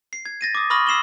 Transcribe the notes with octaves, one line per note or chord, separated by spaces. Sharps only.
C7
G#6
A6 A#6 D#7
D6 D#6
B5 C#6 D#6 F6 A#6 F#7
E6 C7 E7 F#7 G7